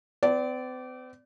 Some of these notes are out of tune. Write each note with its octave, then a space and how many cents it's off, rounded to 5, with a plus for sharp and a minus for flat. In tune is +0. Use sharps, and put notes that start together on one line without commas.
C4 -45 D5 -15